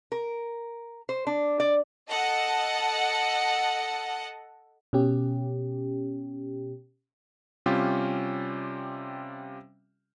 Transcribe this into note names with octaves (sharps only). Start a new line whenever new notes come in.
A#4
C5
D4
D5
A4 D#5 F#5 A5
B2 C#4 G4
C3 G3 C#4 F4 G4